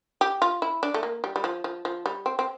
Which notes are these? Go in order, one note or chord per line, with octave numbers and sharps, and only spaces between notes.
G4
F4
E4
D4
A3
A#3
G3
G3
F3
F3
F3
G3
C4
C4